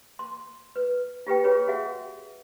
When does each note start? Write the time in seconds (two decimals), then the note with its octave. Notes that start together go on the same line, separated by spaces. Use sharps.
0.19 C6
0.76 B4
1.27 F4 G4 B4 G5
1.44 F4 F#4 G#4 B4 C#5
1.68 F#4 G#4 E5 F#5